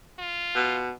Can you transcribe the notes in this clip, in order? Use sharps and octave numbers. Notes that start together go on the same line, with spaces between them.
F4
B2